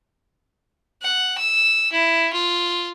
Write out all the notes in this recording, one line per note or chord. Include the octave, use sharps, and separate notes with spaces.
F#5
E6
E4
F4